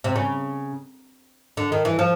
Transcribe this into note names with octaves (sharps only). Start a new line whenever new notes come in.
C3
C#3
D3
D#3
E3
F3